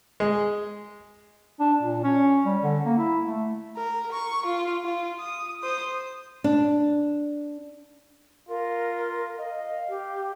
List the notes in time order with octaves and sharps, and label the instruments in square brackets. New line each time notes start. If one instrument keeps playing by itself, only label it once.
[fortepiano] G#3
[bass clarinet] D4
A#2
C#4
G3
D3
A#3
E4
A3
[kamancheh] A#4
C#6
F4
F4
D#6
C5 D#6
[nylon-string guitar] D4
[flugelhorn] F4 [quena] A#4
[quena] D#5 [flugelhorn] F5
[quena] G4